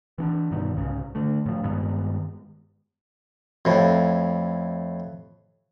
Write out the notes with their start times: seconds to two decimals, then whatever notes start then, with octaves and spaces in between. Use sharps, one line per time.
0.18 E3 C#4 D4
0.51 G2 B2 D#3
0.76 C2 G#2 C#3
1.15 D3 A3
1.46 A2 F3
1.64 G2 D#3 G#3 B3
3.65 F2 A2